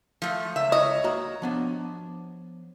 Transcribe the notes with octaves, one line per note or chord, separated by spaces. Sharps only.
F3 A3
C#2 E5
C#5 D#5
A#3 F#4 A#5
F3 B3 D4